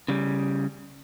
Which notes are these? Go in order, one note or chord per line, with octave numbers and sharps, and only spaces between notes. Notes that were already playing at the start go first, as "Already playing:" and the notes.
C#3 G3